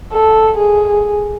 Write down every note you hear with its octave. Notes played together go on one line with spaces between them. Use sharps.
A4
G#4